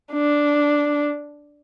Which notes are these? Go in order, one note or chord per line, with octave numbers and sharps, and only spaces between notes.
D4